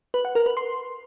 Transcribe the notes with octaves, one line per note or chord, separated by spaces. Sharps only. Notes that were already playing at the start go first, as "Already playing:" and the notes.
B4
F#5
A#4
B4
C6